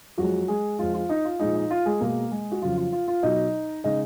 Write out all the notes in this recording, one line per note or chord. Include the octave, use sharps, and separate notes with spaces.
F2 F3 F#3 G#3 F#4
G#3 G#4
F2 F3 G#3 F4
F4
D#4
F4
A#2 F3 G#3 D#4
D#4
F4
G#3 G#4
B2 G#3 A#3 A#4
G#3 G#4
F#4
F2 C#3 F#3 F4
F4
F4
F4
B2 F#3 D#4 D#5
C#3 G#3 D#4 D#5